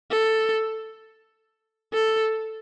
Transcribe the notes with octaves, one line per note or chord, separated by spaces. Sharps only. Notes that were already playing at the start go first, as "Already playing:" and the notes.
A4
A4